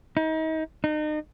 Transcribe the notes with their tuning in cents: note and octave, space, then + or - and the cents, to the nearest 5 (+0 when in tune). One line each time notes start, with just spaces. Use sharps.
D#4 +35
D#4 -35